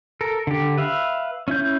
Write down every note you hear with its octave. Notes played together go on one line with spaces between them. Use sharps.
A4 A#4
D3 G4
B4 E5 F5
C#4 E4 G6